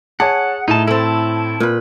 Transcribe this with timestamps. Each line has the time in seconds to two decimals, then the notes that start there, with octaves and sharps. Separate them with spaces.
0.20 G#4 C#5 F#5 A5
0.68 A2 D#4 A5
0.87 A3 C4 E4 A5
1.60 A#2 B4